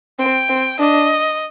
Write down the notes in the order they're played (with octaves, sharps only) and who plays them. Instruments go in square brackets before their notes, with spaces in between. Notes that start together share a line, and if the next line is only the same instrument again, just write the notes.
[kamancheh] C4 [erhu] G5
[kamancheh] C4
[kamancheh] D4 [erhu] D#5